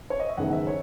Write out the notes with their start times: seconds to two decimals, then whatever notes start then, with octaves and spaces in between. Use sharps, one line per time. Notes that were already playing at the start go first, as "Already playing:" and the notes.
0.10 C#5
0.20 D#5
0.29 E5
0.37 F#1 E2 D#3 G#3 F#5
0.53 E5
0.67 C#5